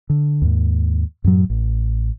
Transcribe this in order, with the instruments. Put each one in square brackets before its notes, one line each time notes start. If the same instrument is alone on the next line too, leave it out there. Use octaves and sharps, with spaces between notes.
[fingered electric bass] D3
D#2 G#2
F#2 A2 F#3
A1